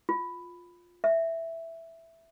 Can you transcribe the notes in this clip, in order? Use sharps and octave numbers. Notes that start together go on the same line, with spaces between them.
F4
E5